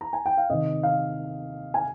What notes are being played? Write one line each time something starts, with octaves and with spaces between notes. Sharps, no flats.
A#5
G#5
G5
F5
C3 D#3 D#5
F5
G#5